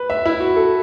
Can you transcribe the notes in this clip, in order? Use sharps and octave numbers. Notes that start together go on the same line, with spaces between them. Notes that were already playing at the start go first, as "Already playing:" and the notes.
Already playing: B4
E5
E4
F#4
A4